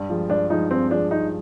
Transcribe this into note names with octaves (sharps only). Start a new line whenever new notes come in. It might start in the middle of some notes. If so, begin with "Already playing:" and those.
Already playing: G2
F3 G#3
G2 D4
F3 G#3 D#4
G2 C4
F3 G#3 D4
G2 D#4